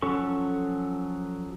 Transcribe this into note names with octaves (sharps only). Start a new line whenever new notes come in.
F3 F#3 C#4 A4 C#6